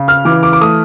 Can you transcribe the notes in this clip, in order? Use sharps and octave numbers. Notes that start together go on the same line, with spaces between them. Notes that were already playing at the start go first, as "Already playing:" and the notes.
Already playing: C#3
F6
E3 D6
D6
D6
A3 D#6